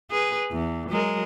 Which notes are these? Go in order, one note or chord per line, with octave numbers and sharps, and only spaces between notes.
G#4 B4
E2
F#3 G#3 A#4